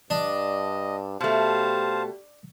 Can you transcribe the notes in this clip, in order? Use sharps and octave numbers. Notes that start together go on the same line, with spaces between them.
G2 D4 D#5
B2 A3 G4 C5 F5 A5